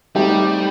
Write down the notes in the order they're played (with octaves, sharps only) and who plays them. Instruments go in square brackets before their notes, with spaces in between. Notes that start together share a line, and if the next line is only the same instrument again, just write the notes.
[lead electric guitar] G3 [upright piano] A3 C4 D#4 G4